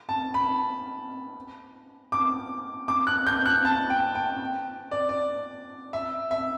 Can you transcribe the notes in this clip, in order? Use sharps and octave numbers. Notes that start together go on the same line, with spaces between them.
A5
B5
D6
D6
F#6
G6
F#6
A5
G5
G5
D5
D5
E5
E5